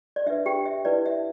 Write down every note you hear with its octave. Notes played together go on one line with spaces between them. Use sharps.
D5
D4 B4 E5
G4 G5
E5
E4 B4 D5
E5